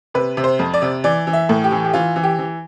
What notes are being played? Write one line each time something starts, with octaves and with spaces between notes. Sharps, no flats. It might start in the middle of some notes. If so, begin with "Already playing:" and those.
C3 B4
C3
C5
F2
D5
C3
E3 D5
E3
E5
A2
G4
E3
G4
E3 F4
E3
G4
E3